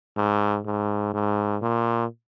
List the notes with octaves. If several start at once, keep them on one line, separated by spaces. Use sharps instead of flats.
G#2
G#2
G#2
A#2